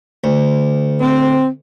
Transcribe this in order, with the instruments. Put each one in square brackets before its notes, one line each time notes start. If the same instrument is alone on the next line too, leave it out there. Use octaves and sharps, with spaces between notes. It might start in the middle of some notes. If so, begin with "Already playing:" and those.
[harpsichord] D2
[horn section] C4